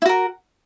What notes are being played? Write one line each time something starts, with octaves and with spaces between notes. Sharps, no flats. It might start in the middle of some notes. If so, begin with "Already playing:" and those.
E4 F#4 A#4